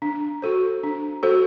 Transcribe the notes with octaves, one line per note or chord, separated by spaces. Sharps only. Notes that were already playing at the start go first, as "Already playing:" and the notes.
D4
F#4 A4 C5
D4
F#4 A4 C5